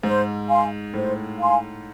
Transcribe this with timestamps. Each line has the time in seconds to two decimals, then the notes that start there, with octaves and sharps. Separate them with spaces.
0.03 G#2 C5
0.49 F5 G#5 C6
0.94 A2 C5
1.40 F5 G#5 C6